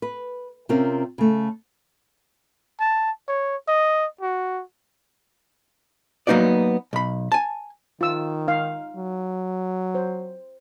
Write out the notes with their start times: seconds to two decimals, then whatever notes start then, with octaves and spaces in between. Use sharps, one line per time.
0.02 B4
0.69 C3 C4 C#4 F4 A#4
1.18 C#3 A3
2.80 A5
3.28 C#5
3.68 D#5
4.21 F#4
6.27 F#3 A#3 B3 D#4 F#4 D5
6.93 B1 B5
7.32 G#5 A5
8.01 D#3 F4 E6
8.48 D#4 F5
8.96 F#3
9.95 C5